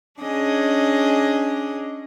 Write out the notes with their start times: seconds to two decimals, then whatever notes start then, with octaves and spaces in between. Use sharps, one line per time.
0.21 C#4 D4 G#4 D#5